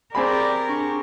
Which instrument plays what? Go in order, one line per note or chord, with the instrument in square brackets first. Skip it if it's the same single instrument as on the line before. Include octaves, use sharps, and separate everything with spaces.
[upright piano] C4 G#4 B5 [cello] G4 A#4 [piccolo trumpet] D5
[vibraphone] D4 [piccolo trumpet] C#6